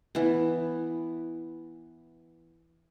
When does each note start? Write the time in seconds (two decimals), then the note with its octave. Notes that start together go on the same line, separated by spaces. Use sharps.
0.15 E3 B3